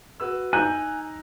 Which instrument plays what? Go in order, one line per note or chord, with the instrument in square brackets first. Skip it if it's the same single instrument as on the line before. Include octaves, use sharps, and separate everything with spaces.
[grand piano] F#4 B4 E6
[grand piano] D#4 A#5 [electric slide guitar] G#5 [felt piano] F#6 G6